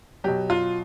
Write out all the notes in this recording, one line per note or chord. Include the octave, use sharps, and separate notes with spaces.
B2 F#3 G4
F4